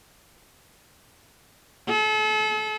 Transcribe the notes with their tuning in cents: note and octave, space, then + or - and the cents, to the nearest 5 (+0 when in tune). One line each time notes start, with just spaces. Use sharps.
A4 -40